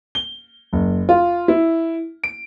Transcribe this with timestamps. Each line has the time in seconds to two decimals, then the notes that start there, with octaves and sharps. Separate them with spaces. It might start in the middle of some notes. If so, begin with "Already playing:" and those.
0.15 G7
0.73 F#1
1.09 F4
1.48 E4
2.24 D7